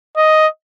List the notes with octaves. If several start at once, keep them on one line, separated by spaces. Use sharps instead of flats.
D#5